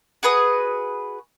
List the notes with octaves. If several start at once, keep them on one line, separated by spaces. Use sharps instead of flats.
F#4 G#4 B4 D#6